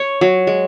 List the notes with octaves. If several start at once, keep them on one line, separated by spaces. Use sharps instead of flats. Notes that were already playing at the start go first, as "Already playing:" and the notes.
Already playing: C#5
F#3
G#3